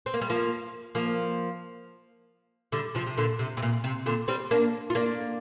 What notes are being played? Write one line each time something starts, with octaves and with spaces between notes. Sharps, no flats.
C4
A#3
G3
F3 A#3
F3 A#3
D3 G3
C3 F3
C3
A#2 D3
C3
C3
A#2
C3
A#2 D3
G3 C4
A#3 D4
F4
A#3 D4